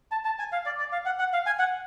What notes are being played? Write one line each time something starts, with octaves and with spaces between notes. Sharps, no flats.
A5
A5
G#5
F5
D5
D5
F5
F#5
F#5
F5
G#5
F#5